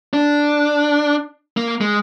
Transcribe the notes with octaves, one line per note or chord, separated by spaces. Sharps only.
D4
A#3
G#3